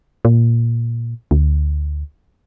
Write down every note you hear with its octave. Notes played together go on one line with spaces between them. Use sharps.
A#2
D2